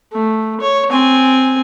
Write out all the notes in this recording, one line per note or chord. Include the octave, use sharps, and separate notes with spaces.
A3
C#5
C4 G#5